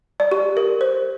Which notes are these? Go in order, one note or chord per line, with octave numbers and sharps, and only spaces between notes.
D5
G4
A#4
C5